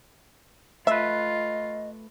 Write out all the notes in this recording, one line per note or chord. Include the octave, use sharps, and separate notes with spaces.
A3 F4 B4 D#5 E5